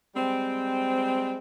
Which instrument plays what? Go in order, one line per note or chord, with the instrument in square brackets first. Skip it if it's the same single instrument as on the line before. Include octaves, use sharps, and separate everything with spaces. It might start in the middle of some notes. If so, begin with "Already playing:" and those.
[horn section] G3 G#3 C4